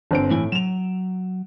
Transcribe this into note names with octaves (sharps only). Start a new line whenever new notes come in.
G1 C4 D7
A2 E3 E4 G#5
F#3 E7 F7